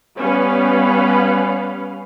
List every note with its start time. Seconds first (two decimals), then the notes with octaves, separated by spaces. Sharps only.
0.18 G3 B3 C#4 B4 F5